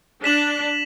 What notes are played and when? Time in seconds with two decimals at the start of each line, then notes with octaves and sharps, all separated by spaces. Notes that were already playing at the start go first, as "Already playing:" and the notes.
0.24 D4 B6 E7 F#7